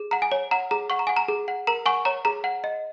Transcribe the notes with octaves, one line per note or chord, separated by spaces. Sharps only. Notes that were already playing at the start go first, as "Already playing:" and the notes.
Already playing: G#4
F#5 A#5
G#5
C#5
F#5 A#5
G#4 A#5
F#5 C#6
A#5
F#5 G#5
A#5
G#4
F#5
A#4 A#5
F#5 G#5 C#6
C#5 A#5
G#4 A#5
F#5
D#5